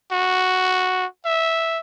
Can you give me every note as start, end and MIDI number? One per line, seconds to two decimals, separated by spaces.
0.12 1.06 66
1.25 1.80 76